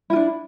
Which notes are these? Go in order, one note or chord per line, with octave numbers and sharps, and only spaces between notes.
D4 E4 F4